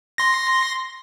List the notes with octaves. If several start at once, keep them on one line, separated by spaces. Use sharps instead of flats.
C6 A#6